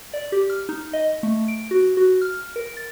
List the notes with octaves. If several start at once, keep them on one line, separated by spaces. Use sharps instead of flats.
D5
G4
F6
D#4
D#5
A3
D7
F#4
F#4
F6
A#4
A6